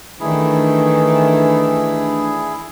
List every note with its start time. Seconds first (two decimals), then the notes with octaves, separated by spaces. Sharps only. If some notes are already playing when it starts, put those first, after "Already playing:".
0.20 D#3 E3 A3 D4 E4 G#4